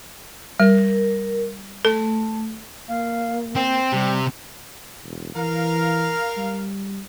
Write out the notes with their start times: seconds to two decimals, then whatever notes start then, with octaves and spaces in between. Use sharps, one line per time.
0.60 G3 A#4
1.85 A3 A4
2.88 A#3 F5
3.56 C4 G5
3.92 C3 G3
5.04 E1
5.35 E3 A#4 F5
6.37 G3